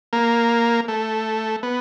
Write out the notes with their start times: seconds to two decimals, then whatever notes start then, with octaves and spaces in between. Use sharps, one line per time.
0.13 A#3
0.88 A3
1.63 B3